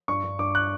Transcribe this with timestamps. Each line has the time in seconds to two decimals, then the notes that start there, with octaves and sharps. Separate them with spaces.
0.08 G2 C#6
0.24 G2
0.39 G2 D6
0.55 F#6